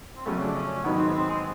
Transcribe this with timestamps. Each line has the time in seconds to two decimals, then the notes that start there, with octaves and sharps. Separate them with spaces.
0.16 C4
0.26 F2 C#3 F#3 A3 C#4
0.41 D4
0.55 C#4
0.84 G#2 D#3 F#3 B3
0.98 C4
1.09 B3
1.14 C4
1.28 G#3